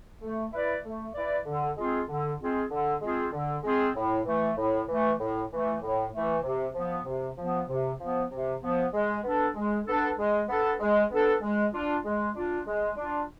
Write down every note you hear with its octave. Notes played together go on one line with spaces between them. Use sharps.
A3
E4 B4 D5
A3
E4 B4 D5
D3
G#3 C4 F4 G#4
D3
G#3 C4 F4 G#4
D3
G#3 C4 F4 G#4
D3
G#3 C4 F4 G#4
A2
E3 A3
A2
E3 A3
A2
E3 A3
A2
E3 A3
C3
F3 B3
C3
F3 B3
C3
F3 B3
C3
F3 B3
G#3
B3 D4 A4
G#3
B3 D4 A4
G#3
B3 D4 A4
G#3
B3 D4 A4
G#3
D4 F4
G#3
D4 F4
G#3
D4 F4